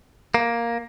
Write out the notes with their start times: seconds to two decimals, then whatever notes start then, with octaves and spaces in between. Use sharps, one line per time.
0.34 A#3